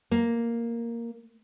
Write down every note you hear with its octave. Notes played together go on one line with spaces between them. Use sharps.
A#3